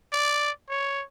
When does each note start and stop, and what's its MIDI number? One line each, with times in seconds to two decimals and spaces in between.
0.12 0.51 74
0.70 1.04 73